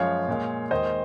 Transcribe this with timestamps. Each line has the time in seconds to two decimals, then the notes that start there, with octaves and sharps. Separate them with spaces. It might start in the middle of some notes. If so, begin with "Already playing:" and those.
Already playing: F#2 F3 G#3 C#5 F5
0.28 A#2 G#3
0.71 D#2 D#3 G#3 C5 D#5